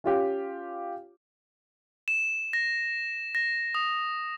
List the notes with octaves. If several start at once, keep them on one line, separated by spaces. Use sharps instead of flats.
C#4 F4 G4
E7
A#6
A#6
D#6